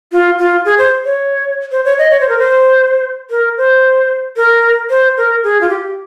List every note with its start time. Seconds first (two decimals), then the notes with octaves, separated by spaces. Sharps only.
0.12 F4
0.38 F4
0.65 G#4
0.78 C5
1.05 C#5
1.72 C5
1.85 C#5
1.98 D#5
2.11 C#5
2.21 C5
2.29 A#4
2.39 C5
3.30 A#4
3.57 C5
4.36 A#4
4.90 C5
5.17 A#4
5.43 G#4
5.61 F4
5.69 G4